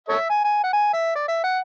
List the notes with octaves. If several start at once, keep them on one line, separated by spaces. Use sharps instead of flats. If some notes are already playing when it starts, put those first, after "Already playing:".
A4 C#5 E5
G#5
G#5
F#5
G#5
E5
D5
E5
F#5